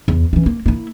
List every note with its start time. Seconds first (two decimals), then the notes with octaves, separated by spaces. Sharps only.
0.08 E2
0.33 E3 C#4
0.46 A#3
0.66 A#3 E4